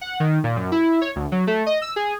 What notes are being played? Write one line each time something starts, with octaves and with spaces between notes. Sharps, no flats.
F#5
D#3
A#2
F#2
E4
C#5
D2
F#3
A3
D#5
E6
G#4